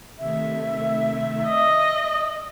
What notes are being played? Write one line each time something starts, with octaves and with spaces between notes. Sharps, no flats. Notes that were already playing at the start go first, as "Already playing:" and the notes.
C3 D#3 A3 E5
D5 D#5 E6